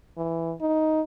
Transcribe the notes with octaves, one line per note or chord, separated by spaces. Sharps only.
E3
D#4